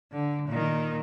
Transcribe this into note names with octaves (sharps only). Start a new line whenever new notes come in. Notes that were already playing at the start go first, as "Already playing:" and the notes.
D3
A#2 D#3